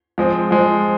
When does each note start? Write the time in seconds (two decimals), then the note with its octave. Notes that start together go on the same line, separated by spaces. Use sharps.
0.18 F3 G#3 C4
0.51 F3 G#3 C4